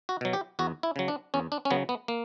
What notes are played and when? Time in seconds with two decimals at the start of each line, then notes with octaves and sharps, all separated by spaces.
0.09 F#4
0.21 B2 F#3
0.33 G4
0.59 E2 F#4
0.83 E4
0.96 C#3 F#3
1.08 D4
1.34 E2 C#4
1.52 D4
1.65 C#4
1.71 C#3 F#3 B3
1.89 B3
2.08 A#3